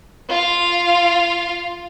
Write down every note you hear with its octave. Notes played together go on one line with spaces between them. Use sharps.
F4 F5